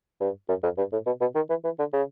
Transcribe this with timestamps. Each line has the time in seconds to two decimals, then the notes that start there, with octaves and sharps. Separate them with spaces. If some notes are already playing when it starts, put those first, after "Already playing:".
0.20 G2
0.49 F#2
0.63 F2
0.78 G2
0.93 A2
1.06 B2
1.21 B2
1.35 D#3
1.50 E3
1.64 E3
1.79 D3
1.93 C#3